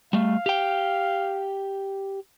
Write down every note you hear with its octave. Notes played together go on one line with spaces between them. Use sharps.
G3 A3 F5
G4 G5